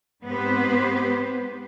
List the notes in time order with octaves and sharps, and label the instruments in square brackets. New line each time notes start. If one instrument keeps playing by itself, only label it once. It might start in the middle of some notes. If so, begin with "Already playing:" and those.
[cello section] G#2 B3 C4 G4 B4 C5